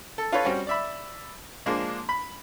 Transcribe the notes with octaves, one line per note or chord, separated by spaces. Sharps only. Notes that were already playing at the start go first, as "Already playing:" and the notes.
A4
F4 A4 B4 C#5
G3 C4 C#4 F#4
D5 E5 B5
F3 G#3 A#3 D4
B5